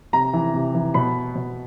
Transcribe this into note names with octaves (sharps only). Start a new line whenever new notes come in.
C3 A#5
E3
C3
E3
B2 B5
B2